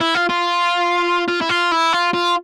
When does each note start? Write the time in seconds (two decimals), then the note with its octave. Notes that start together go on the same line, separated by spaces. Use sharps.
0.01 E4
0.15 F4
0.29 F4
1.28 F4
1.41 E4
1.49 F4
1.71 E4
1.93 F4
2.13 F4